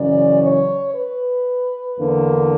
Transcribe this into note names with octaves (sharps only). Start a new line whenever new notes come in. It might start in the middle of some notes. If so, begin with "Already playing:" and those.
Already playing: F#2 C#3 E3 D5
C#5
B4
E2 D3 A#3